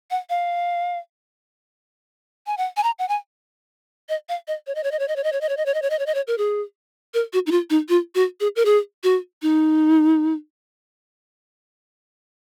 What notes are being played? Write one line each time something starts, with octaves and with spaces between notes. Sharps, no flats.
F#5
F5
G#5
F#5
G#5
A#5
F#5
G#5
D#5
F5
D#5
C#5
D#5
C#5
D#5
C#5
D#5
C#5
D#5
C#5
D#5
C#5
D#5
C#5
D#5
C#5
D#5
C#5
D#5
C#5
A#4
G#4
A#4
F#4
D#4
F4
D#4
F4
F#4
G#4
A#4
G#4
F#4
D#4